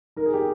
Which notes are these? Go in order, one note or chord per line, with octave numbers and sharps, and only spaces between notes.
D#4 A#4
G#4
G4